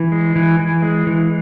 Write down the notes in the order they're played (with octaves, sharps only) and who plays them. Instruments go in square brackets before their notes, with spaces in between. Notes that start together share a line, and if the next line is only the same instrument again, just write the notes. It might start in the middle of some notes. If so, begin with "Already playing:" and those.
Already playing: [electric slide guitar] E3
G#3
E3
E3
G#3
E3